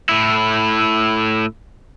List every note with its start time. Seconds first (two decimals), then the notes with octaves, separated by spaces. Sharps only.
0.09 A2 E4